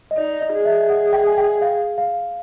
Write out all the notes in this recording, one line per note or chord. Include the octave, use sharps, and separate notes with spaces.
D#5
D#4 D5
D#5
G#4
E5
F#5
G5
G#5
G5
F5
F5